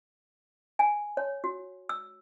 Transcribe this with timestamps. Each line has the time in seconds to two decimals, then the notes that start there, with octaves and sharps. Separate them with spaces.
0.79 G#5
1.17 C#5
1.44 F#4
1.89 E6